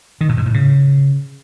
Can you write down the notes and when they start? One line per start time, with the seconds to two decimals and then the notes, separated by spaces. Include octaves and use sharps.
0.21 D#3
0.29 A2
0.37 G#2
0.46 A2
0.54 C#3